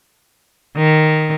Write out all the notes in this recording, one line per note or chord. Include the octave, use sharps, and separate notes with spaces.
D#3